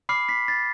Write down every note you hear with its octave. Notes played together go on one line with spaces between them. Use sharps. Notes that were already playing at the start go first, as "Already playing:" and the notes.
B5 D6 F6 C7
B6
A6